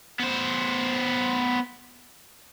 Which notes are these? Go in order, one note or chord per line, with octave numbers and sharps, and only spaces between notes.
B3 C5